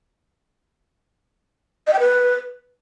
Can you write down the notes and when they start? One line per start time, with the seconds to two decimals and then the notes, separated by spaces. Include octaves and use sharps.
1.87 D#5
1.93 G5
2.00 B4